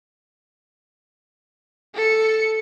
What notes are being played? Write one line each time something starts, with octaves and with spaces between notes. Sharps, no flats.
A4 C#7